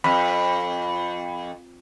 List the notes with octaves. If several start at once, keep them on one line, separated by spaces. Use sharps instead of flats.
F2 B5